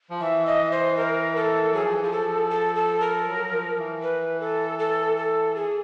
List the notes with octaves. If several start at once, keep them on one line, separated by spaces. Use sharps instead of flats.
F3
E3 E5
D#5
C5
A#4
A4
F#3 G#4
F3
E3
F3 G#4
A4
A4
A4
A#4
F#3
F3
E3
B4
A4
A4
A4
G#4